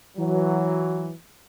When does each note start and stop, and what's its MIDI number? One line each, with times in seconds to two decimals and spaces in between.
0.17 1.10 52
0.17 1.10 54